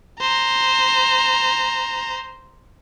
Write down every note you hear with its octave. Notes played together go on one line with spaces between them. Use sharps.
C5 A#5